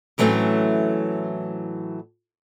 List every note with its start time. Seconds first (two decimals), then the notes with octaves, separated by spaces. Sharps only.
0.18 A2 E3 F#3 A3 C4 C#4